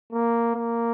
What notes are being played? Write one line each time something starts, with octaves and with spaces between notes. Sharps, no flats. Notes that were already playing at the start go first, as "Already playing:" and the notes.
A#3
A#3